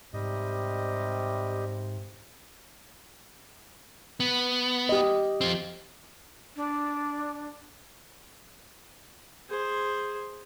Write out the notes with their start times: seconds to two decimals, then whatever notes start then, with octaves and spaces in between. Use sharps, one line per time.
0.14 G#2 C3 G3 G4 D#5
4.20 B3
4.89 G4 D#5
5.41 F3 C4
6.56 D4
9.50 G#4 C5